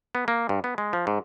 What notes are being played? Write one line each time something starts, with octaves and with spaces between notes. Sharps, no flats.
B3
A#3
G2
B3
G#3
F3
G#2